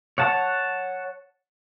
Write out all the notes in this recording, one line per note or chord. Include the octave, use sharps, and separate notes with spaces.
C#5 F#5 A5